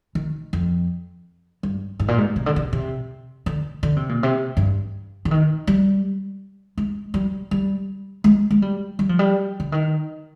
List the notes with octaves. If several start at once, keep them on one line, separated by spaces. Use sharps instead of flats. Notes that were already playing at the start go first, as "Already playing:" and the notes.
D#3
F2
G2
G#2
A#2
G#2
C3
D3
C3
C3
D3
D3
C3
A#2
C3
G2
D3
D#3
G3
G#3
G3
G3
G#3
G#3
G3
G3
F3
G3
D3
D#3